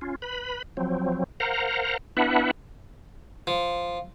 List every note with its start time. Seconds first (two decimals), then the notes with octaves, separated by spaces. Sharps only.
0.01 C#4 F4
0.22 B4 B5
0.77 F3 F#3 C4
1.40 A#4 C5 F5 F#5 A#5
2.17 B3 D4 E4 B4 E5 F#5
3.47 F3